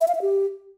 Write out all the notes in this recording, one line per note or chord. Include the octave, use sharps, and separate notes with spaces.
E5
F5
E5
G4